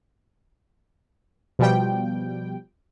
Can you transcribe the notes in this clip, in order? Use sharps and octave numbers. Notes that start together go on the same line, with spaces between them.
B2 F3 G3 G5